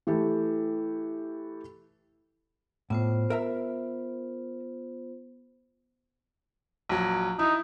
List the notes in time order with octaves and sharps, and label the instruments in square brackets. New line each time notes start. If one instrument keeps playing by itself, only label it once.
[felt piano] E3 A3 G4 A4
[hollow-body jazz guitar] A2 [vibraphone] B3 F4 C5
[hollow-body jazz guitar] A#4 E5 A#5
[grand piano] A#1 F#3
[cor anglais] D#4 [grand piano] E4